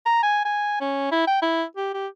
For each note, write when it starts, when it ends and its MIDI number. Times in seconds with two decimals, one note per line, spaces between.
0.06 0.21 82
0.23 0.40 80
0.45 0.79 80
0.81 1.07 61
1.12 1.27 64
1.27 1.38 79
1.42 1.64 64
1.77 1.93 67
1.94 2.07 67